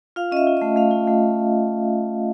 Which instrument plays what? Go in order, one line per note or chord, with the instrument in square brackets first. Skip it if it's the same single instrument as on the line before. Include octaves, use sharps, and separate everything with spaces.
[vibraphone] F4 F5
C#4 D#5
E5
F4
D#5
A3
A3 F5
F4
A3